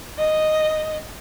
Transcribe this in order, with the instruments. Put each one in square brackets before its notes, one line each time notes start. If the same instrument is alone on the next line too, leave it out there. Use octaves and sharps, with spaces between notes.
[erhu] D#5